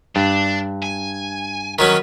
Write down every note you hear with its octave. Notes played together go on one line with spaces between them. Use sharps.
G2 D4
G#5
D#3 F#3 C#4 B4